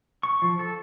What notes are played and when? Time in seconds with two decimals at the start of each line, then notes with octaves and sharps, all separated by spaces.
0.23 C#6
0.42 F3
0.59 A4